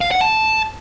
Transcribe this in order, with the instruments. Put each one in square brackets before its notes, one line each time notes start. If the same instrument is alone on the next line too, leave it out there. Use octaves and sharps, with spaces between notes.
[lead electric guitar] F5
F#5
A5